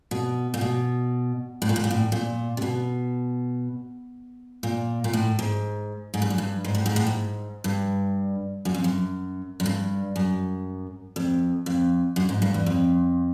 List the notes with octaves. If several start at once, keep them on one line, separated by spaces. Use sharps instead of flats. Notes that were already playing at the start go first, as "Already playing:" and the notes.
B2
A#2
B2
A2
A#2
A2
A#2
A2
A#2
C3
B2
A#2
A#2
A2
G#2
G#2
G2
F#2
G2
G#2
A2
G#2
A2
G#2
G2
F#2
F2
F#2
F#2
G2
F#2
F2
F2
F#2
G#2
G2
E2
F2